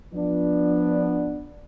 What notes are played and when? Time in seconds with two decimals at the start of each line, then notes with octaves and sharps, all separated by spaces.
0.13 F3 B3 D4